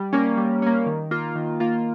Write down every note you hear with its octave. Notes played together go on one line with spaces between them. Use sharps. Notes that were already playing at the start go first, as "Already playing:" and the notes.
Already playing: G3
A#3 C#4
G3
A#3 C#4
D#3
A#3 F4
D#3
A#3 F4